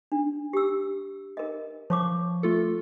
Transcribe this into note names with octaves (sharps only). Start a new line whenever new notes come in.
D4
G4 E6
A#4 D#5
F3 C#5 C#6 D6
A3 F4 A4